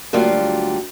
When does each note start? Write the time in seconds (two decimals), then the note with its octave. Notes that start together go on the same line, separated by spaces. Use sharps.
0.13 D2 F#3 G3 A#3 F4 F5